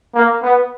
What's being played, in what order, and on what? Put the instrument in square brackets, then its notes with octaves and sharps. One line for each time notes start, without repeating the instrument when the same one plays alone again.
[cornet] A#3
B3